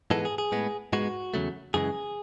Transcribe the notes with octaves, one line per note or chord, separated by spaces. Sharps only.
G#2 E3 G#3 B3 A4
G#4
G#4
A2 G#3 B3
G#2 G#3 B3 F#4
E2 C#3 F#3 A3
F#2 C#3 E3 G#3 G#4